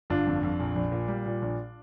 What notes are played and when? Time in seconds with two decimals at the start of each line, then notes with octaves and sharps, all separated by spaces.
0.10 G1 D4 F4
0.27 F2
0.43 F2
0.60 A#1
0.76 A#1
0.92 A#2
1.08 G3
1.26 A#2
1.42 A#1